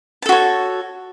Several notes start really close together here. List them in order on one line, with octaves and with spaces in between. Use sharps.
A5 A4 F#4 C#5